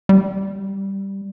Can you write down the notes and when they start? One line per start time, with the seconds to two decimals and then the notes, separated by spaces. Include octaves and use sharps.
0.09 G3